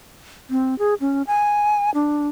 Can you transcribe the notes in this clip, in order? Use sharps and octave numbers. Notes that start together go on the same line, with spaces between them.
C4
G#4
C#4
G#5
D4